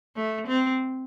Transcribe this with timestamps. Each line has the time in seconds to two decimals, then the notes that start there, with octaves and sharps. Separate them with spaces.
0.16 A3
0.47 C4